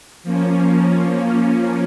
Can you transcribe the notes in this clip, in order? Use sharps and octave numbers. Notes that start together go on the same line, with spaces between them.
F3 A#3 C#4